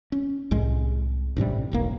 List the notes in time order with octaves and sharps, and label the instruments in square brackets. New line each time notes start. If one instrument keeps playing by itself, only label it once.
[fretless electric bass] C#4
C2 A2 G#3
A1 G2 C3 G3
E1 B1 A#3